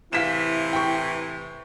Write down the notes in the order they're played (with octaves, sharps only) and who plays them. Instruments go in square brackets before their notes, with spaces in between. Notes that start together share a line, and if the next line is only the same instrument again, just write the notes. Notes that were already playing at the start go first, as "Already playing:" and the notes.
[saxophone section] A2 C3 E3 [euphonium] E4 [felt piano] F5 B6 E7
[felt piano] G5 C#6